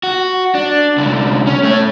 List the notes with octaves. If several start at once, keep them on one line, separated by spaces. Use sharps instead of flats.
F#4
D4
C2 D3
C#4
A3 C#5